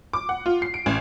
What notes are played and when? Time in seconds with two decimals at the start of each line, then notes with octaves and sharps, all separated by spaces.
0.13 D6
0.29 F#5
0.46 F4
0.62 C7
0.74 D7
0.86 A1